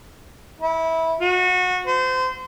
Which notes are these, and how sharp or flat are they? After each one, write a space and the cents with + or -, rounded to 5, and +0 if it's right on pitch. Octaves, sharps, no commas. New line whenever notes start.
E4 -20
F#4 -25
C5 -30